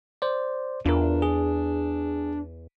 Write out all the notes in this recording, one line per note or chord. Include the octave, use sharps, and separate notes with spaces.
C5 D5
E2 D4 F4 A#4
G#4